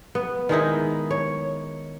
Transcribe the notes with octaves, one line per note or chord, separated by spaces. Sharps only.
B3
D#3 G#3 D#4 E4
C#5